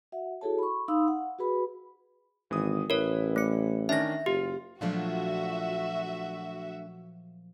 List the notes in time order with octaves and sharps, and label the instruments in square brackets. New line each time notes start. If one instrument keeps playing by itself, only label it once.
[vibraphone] F#4 E5 F#5
E4 F#4 G#4 A4 C#5 A5
B5 C#6
D#4 F5 B5 C6 D#6 E6
F#5
F#4 G#4 B4 B5
[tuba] G#1 [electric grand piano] E3 D#6
[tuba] A1 [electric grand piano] E4 B4 [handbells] A#4 C#5
[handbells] A3 C#7
[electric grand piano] D#3 C#4 D4 [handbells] E5 A#6
[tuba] F#1 [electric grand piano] F4 [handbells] G4
[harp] A#2 F3 F#3 [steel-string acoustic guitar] A3 D4 F4 [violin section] F#4 E5